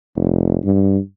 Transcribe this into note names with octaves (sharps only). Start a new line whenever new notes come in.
F1
G2